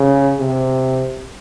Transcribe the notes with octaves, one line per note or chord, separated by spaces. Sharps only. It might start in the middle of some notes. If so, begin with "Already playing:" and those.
Already playing: C#3
C3